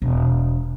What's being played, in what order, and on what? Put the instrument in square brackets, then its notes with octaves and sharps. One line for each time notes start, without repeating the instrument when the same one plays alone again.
[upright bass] E1